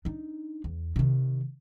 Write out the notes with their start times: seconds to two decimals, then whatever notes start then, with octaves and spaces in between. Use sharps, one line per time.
0.05 D4 D#4
0.64 E2
0.96 C3 D#3